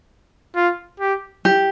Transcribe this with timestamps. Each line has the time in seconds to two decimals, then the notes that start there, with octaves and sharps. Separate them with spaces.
0.56 F4
1.00 G4
1.45 G4